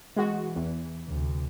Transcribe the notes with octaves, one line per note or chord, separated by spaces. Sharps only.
E3 G#3 F#4
E2
D2 C3